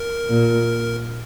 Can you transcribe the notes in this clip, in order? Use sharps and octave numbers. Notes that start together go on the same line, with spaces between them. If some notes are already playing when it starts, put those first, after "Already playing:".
Already playing: A#4
A#2